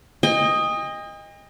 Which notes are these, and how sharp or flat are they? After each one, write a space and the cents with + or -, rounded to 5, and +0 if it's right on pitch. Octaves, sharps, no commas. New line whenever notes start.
D#5 +0 G5 +45